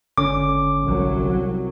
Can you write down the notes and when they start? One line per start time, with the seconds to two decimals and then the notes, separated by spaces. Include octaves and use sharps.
0.18 G#1 D3 C#4 D6
0.83 C2 F#3